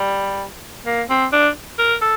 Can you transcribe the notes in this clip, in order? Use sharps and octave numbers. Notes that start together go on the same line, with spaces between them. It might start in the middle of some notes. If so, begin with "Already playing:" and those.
Already playing: G3
A#3
C4
D4
A#4
A4